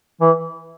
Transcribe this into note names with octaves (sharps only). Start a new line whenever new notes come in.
E3